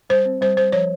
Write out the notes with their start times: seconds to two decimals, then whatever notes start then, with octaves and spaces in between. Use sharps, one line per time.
0.10 G3 C5
0.25 C4
0.41 G3 C5
0.57 G3 C5
0.72 F3 C#5